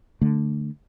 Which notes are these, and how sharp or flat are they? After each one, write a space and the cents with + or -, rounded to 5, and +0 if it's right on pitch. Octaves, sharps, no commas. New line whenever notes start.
D3 +0 A3 +0